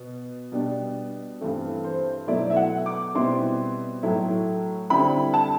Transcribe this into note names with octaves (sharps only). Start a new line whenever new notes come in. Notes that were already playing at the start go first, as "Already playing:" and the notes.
Already playing: B2
B2 G3 D4
G2 E3 A3 C4
C5
B2 F#3 A3 E4 D5
E5
F#5
D6
B2 G3 C4 E4 C6
A2 F#3 A3 E4
D3 G3 C4 E4 B5
A5